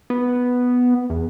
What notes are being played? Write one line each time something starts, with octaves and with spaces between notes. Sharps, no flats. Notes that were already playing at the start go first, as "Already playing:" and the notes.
B3
E2